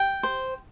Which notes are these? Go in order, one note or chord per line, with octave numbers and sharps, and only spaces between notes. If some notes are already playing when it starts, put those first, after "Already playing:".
Already playing: G5
C5